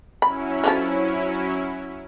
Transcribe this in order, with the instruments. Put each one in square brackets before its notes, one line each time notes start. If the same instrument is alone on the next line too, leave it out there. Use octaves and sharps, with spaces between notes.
[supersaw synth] F#3 C#4 E4 [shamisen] B5
[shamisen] D3 F3 A4